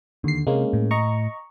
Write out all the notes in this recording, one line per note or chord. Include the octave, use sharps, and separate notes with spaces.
D#2 D3 C7
C3 G#3 A#3 C#4
A2
D#5 A#5 C#6